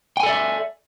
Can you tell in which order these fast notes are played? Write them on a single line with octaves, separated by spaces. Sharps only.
G5 G#5 A4 D5 E5